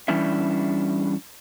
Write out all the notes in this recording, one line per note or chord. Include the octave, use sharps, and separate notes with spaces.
E3 G3 C#4 D4 E4 E5